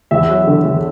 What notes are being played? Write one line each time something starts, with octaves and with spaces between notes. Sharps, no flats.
E2 E5
F#3
D3
E2